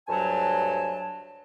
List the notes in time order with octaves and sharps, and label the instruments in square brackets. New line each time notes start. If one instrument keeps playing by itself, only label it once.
[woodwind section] D2 G2 F#3 G#5 A5